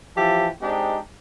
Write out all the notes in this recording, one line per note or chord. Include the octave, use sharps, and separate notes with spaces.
E3 F3 G4 E5 A5
G#3 C4 D4 D#4 G4